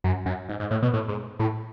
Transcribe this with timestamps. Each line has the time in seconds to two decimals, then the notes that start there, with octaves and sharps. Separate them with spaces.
0.04 F#2
0.26 F#2
0.49 G#2
0.60 G#2
0.71 A2
0.82 B2
0.94 A2
1.08 G#2
1.39 A2